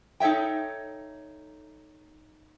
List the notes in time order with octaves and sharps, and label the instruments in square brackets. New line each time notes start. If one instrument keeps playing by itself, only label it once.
[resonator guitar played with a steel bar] D#4 A4 C#5 E5 G5